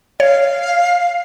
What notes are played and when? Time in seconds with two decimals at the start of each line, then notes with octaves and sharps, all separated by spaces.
0.20 C#5 F5